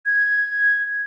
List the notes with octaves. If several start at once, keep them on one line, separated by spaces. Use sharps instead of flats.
G#6